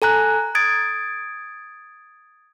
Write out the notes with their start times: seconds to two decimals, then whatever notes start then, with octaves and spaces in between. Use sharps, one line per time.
0.02 A4 G#5 A#5 F#6
0.55 D#6 G#6 A6 D7